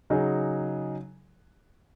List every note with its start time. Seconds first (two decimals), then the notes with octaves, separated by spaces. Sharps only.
0.10 C#3 F#3 D#4 G#4